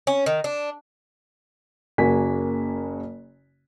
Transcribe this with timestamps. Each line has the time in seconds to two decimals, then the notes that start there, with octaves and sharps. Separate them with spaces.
0.07 C#4
0.26 D#3
0.44 D4
1.98 F#1 C#3 A#3 F#4 G#5 B6